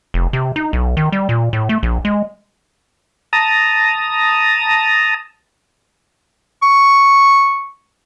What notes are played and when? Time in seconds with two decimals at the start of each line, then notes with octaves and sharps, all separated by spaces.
0.14 F1
0.33 C3
0.56 D#4
0.73 B1
0.97 D#3
1.12 G3
1.29 A#2
1.53 A2
1.69 A3
1.83 A#1
2.05 G#3
3.33 A5 A#5 D#6
6.63 C#6